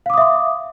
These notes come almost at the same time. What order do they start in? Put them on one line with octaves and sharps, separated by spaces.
F5 D6 D#6 E5 C6